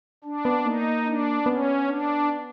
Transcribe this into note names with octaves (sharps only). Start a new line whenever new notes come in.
D4
B3
A#3 D#4
D4
B3 C#4
D4